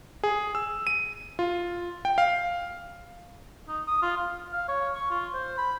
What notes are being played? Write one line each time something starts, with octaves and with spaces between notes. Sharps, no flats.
G#4
E6
D#7
F4
G5
F5
D#4
D#6
F4
F5
F5
C#5
C#6
F4
C5
B5